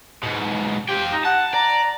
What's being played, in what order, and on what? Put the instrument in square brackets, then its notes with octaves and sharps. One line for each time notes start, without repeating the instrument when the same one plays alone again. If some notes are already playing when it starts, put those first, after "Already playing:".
[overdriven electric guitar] G#2 B2
[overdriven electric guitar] F4 G5 [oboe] G4
[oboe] D#4
[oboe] F#5 [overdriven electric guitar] A5
[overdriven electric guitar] D5 [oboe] A#5